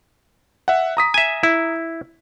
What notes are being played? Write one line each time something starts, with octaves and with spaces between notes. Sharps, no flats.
E5 F#5
A#5 D#6 B6
E5 G#5
E4